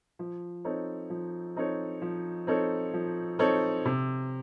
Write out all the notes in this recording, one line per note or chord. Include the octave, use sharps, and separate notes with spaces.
F3
C4 D#4 A4 C#5
F3
C4 D#4 A4 C#5
F3
C4 D#4 A4 C#5
F3
C4 D#4 A4 C#5
C3